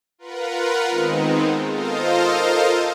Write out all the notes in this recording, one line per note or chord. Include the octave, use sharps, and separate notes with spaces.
F4 A#4 B4 F#5
D#3 G#3 B3 C4 D#4
F4 A4 A#4 C5 D#5 F5